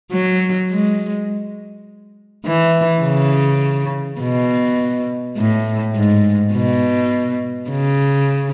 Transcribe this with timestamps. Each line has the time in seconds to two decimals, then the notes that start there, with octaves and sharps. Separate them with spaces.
0.12 F#3
0.70 G#3
2.46 E3
3.04 C#3
4.21 B2
5.37 A2
5.95 G#2
6.53 B2
7.71 C#3